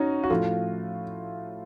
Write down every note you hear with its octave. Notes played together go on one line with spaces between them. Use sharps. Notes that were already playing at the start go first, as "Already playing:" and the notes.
Already playing: C#4 D#4 F#4
F#4
A2 F3 A3 F4